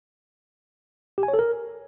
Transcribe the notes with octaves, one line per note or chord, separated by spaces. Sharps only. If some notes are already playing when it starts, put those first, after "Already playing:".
G4
G#5
C#5
A4
A#4